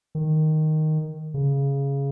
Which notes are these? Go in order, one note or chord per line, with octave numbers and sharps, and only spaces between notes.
D#3
C#3